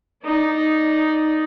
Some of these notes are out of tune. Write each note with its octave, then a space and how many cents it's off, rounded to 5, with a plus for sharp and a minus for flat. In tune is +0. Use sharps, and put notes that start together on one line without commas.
D#4 +0 D5 +0